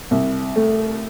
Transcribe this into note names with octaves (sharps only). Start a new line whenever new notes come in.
C2
A3